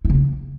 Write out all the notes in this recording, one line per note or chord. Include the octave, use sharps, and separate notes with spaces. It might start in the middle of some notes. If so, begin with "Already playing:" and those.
E4
C#3
A#3